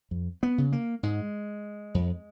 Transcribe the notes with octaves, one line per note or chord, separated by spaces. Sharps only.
F2
B3
C#3
A#3
G#2 G#3
F2